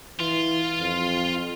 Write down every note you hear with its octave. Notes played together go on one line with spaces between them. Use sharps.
E3 F4
F2